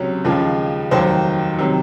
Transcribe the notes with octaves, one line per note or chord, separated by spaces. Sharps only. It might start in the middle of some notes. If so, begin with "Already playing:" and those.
Already playing: C#2 C3 F#3 C#4
D#2 C#3 F3 G#3
F1 D#2 D#3 F#3 C5
C3 D#3 F#3